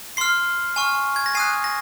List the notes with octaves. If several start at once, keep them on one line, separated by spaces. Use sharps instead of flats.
C6 F6 C7
G#5 C#6 F6
G#6
A#6
G#5 D#6 F#6 C7
A#6